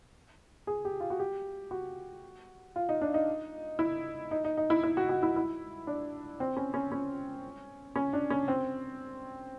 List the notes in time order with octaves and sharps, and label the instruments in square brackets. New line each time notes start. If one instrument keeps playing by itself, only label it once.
[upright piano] G#4
G4
F4
F#4
G4
F#4
F4
D#4
D4
D#4
E4
D#4
D#4
D#4
E4
E4
F#4
F#4
E4
E4
D4
C4
C#4
C#4
C#4
C#4
D4
C#4
C4